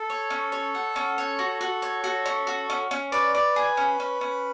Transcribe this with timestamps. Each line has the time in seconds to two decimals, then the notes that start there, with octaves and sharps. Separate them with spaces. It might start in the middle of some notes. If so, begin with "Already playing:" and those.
Already playing: A4
0.10 C#5
0.30 C#4
0.52 C#5
0.75 F#5
0.96 C#4
1.18 C#5
1.39 F#4
1.61 F#4
1.82 C#5
2.04 F#4
2.26 C#4
2.47 F#4
2.70 C#4
2.91 C#4
3.12 B4 D5
3.35 D5
3.56 G#4
3.77 C#4
4.00 C#4
4.21 C#4